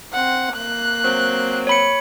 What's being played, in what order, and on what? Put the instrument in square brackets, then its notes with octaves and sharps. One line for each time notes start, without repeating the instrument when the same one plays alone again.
[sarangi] C4 [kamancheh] F#5
[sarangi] A#3 [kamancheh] F#6
[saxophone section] F#3 C4
[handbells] C#5 B5 C#7